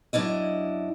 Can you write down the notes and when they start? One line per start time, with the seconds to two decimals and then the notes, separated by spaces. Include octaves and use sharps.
0.13 F#2 D4 E4 D#5